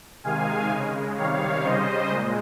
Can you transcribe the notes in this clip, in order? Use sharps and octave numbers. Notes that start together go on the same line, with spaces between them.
C3 D#3 G#3 F5 G#5
C#3 G#3
C3 D#3 G3 C#5 F5
C#3 G3 C5 D#5
A#2 G#3